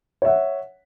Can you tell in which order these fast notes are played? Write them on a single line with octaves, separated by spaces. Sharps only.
C#5 E5 F#5